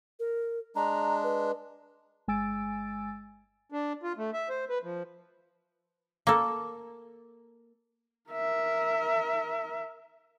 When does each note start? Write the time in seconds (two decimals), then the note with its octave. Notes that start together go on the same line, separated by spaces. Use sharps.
0.20 A#4
0.76 G#3 D4 A#5
1.23 B4
2.28 G1 G#3 G#5 E6 A6 D7
3.72 D4
4.03 F4
4.18 A3
4.33 E5
4.49 C5
4.69 B4
4.83 F3
6.27 A#3 A4
8.30 A#4 E5